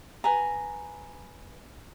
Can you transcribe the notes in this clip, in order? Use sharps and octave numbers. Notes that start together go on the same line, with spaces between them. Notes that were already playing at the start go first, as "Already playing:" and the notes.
B4 G#5 A#5